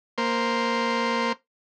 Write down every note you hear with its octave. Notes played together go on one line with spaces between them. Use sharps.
A#3 C5